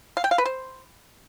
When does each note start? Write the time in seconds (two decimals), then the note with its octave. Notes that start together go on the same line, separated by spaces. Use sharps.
0.17 F5
0.24 G5
0.31 F5
0.38 B4
0.45 C5